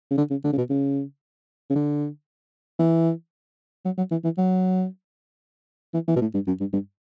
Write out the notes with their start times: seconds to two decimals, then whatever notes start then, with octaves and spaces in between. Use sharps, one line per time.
0.11 C#3
0.18 D3
0.30 C#3
0.44 D3
0.53 C#3
0.57 B2
0.70 C#3
1.70 C#3
1.75 D3
2.79 E3
3.85 F#3
3.98 F#3
4.11 E3
4.24 E3
4.38 F#3
5.94 E3
6.08 E3
6.16 B2
6.21 A2
6.34 G2
6.47 F#2
6.60 G2
6.73 G2